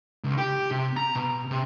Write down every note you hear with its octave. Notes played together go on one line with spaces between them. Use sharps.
C#2
G4
C3
A#5
B2
C3